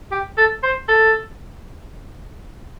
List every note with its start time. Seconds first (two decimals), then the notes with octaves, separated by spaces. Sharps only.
0.12 G4
0.38 A4
0.63 C5
0.89 A4